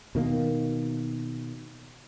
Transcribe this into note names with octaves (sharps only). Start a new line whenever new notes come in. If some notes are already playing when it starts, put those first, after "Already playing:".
B2 D#3 A#3